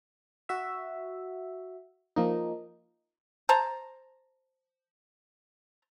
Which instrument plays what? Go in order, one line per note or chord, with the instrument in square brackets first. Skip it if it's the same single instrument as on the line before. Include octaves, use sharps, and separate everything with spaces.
[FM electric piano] F#4 E5
F3 A#3 D#4
[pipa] C5 A5 A#5